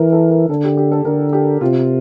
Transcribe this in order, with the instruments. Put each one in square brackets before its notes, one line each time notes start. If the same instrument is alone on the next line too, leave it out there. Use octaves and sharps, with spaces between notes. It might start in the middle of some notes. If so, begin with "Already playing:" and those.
Already playing: [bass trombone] E3 [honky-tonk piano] A#4
[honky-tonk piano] A4
A#4
[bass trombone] D3 [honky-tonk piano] A4
[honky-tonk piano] G4
G4
A4
[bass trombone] D3 [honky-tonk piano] A#4
[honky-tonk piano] G4
[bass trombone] C3 [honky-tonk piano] F4